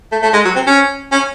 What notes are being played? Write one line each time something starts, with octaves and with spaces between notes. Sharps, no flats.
A3
A3
G#3
F#3
C4
C#4
C#4